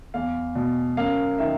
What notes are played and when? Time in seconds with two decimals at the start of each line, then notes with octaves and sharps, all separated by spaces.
0.14 E2 F5
0.55 B2
0.97 F#2 F5
1.39 D#3 E5